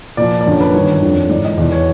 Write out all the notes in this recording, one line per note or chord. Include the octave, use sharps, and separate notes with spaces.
A#2 F3 D5
D5
F#2 D3 F3 C#5
B4
G2 D#3 C#5
F2 D3 F3
G#2 E3 D5
D#5
E2 B2 D5
C#5